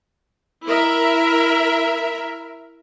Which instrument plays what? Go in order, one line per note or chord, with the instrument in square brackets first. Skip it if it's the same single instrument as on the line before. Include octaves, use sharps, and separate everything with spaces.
[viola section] E4 A#4 E5